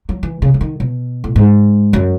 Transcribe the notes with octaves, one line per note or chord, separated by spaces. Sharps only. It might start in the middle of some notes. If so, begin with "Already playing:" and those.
F#3
E3
C#3
C#3
D#3
B2
A2
G#2
F#2